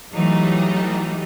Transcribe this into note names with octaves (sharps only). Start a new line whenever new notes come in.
E3 F#3 G3 A3 D#4